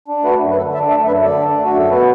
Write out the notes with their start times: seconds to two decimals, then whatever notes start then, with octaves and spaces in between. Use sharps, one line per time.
0.08 D4
0.24 A3 F#4 B4
0.41 F#2
0.51 B4
0.57 D3 A4
0.74 D4 E5 A5
0.90 A3 E5 A5
1.07 F#2 B4 E5
1.24 D3 A4 D5
1.40 D4
1.57 A3
1.65 F#4
1.73 F#2 A4
1.90 B2 F#4 B4